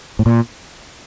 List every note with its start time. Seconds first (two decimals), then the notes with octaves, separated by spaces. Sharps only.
0.19 A2
0.26 A#2